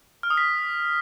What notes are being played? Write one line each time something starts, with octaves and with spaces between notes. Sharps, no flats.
F6
D#6
B6